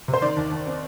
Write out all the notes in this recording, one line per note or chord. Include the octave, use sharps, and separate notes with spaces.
C3
C5
D#3 D5
D#2
D#2
C4